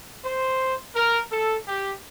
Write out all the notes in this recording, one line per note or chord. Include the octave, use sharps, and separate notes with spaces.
C5
A#4
A4
G4